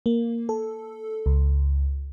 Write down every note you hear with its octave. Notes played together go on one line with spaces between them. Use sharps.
A#3
A4
C#2